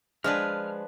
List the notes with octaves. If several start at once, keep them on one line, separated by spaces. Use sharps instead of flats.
F3 G#3 D4 B4 F6